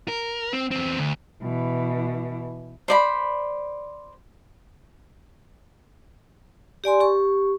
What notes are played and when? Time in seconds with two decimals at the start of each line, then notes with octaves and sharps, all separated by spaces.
0.08 A#4
0.53 C4
0.71 E2 C4
0.98 D2
1.42 B2 E3
2.88 C5 D5 B5
6.84 G4 D5 G#5 C6
7.01 G4 C#6